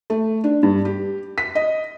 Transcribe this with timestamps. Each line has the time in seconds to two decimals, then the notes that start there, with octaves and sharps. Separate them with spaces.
0.10 A3
0.44 D4
0.63 G2
0.85 G4
1.38 B6
1.55 D#5